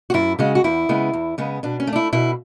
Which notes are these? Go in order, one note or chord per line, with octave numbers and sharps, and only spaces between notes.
F#4
F#2 E4
C#3 G#3 F#4
F#4
E2 E4
C#3 G#3 B3
E2
C#3 G#3 B3
B2 D4
C#4
A3
D4
E4
B2 E4